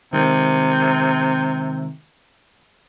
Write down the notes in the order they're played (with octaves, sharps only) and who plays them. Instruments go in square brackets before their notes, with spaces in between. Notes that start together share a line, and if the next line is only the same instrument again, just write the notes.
[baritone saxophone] C3 [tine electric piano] D#3 G#3